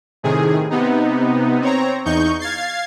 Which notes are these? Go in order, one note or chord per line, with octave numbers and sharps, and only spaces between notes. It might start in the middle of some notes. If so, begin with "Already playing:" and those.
A2 C3 D#3 G#4
C3 B3 D#4
C4 C#5 A#5
E2 D#4 C#6 G6
F5 G#6 A6 C7